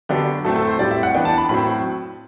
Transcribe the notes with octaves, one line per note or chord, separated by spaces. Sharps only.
D3 F#3 B3 D4 G4
A2 F#3 A3 C4 A4
A4
C5
A2 G3 C4 D5
E5
F#5
E3 B3 D4 G5
A5
B5
A2 F#3 C4 B5